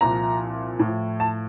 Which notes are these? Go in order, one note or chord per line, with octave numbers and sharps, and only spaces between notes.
C2 A#2 F3 A#5
A2
F3
A5